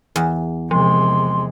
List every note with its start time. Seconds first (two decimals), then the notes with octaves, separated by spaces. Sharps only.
0.16 E2
0.71 C3 F3 G#3 C6